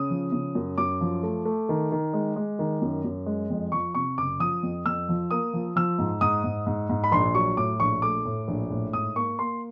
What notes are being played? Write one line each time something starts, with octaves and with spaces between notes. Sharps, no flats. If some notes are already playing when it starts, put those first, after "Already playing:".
Already playing: C#3 D#6
F3
C#3
F#2
F#2 D6
F3
A3
A3
D#3
D#3
G#3
G#3
D#3
F#2
F#2
G#3
F2
F3 C#6
C3 C#6
F#1 D6
F3 D#6
F2
F2 E6
F3
A#3 D#6
F3
F3 E6
G#2
G#2 D#6
G#2
G#2
G#2
B5
A#1 C6
F#3 C#6
A2 D6
A#1 C#6
A3 D6
A2
A#1
A2
G#2 D#6
A#3 C#6
A#3 C6